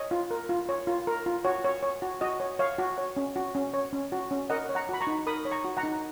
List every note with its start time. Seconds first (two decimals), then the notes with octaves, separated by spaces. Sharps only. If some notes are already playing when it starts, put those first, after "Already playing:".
Already playing: C#5 D#5
0.11 F4
0.31 A#4
0.49 F4
0.69 C#5
0.87 F4
1.07 A#4
1.26 F4
1.45 F#4 C#5
1.64 C#5
1.82 C#5
2.02 F#4
2.21 F#4 D#5
2.40 C#5
2.59 C#5 F5
2.78 F#4
2.98 C#5
3.17 C#4
3.36 F#4
3.55 C#4
3.74 C#5
3.93 C#4
4.12 F#4
4.31 C#4
4.50 A#4 D#5 F#5
4.69 C#5
4.75 F#5 A#5
4.89 F#4 B5
5.01 A#5 C#6
5.07 D#4
5.26 A#4 B5 D#6
5.45 C#5
5.51 A#5 C#6
5.65 F#4
5.77 F#5 A#5
5.83 D#4